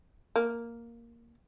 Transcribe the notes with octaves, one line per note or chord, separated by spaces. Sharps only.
A#3